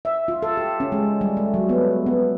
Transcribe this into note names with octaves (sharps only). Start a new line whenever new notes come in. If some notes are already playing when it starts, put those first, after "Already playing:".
E5
F4
A4
G4
C#4
G#3
G3
A3
F#3
B3
B3